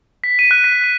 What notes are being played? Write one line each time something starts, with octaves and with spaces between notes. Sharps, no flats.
B6
D#7
F#6
B6
D#7